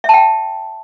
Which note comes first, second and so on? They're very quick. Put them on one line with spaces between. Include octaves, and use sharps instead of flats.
E5 A5 G5